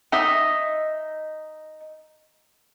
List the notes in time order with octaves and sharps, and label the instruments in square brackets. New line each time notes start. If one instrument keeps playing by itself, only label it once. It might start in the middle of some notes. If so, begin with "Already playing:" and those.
[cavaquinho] D#4 D#5 E5 D#6